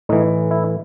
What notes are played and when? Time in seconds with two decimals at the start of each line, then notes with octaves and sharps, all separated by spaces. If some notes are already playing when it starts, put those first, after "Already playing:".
0.09 A2 E3 D#4
0.51 E4